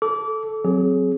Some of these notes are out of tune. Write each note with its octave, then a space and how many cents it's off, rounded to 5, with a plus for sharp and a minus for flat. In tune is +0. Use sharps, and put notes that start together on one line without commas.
A4 -10 D6 -25
F#3 +0 C4 +0 G#4 +20